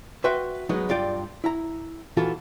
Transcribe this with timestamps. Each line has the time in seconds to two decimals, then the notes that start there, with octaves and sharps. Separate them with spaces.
0.24 F#4 B4 E5 G5 C6
0.69 F#3 G#3 B3 D#4
0.89 G2 F4 D5 G5
1.44 E4 A#5
2.17 A#2 E3 F4 F#4 A4